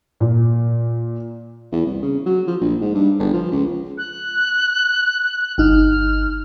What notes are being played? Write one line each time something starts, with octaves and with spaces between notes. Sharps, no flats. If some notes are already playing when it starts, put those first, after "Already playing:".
A#2
E2
C2
C#3
F#3
F3
A#1
G#2
G2
G1
F3
C#2
F#6
G1 D#4 F6